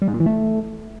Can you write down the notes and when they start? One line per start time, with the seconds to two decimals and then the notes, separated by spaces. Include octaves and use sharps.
0.02 G3
0.08 G#2
0.14 A#2
0.20 E3
0.26 A3